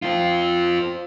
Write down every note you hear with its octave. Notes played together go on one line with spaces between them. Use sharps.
C4 F4